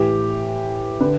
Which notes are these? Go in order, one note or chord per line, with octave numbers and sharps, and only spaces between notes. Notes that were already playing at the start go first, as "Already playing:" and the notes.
Already playing: A2 E3 G4
D3 B4